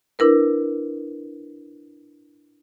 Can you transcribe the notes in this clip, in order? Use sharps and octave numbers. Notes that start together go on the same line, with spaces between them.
D4 E4 A#4 B4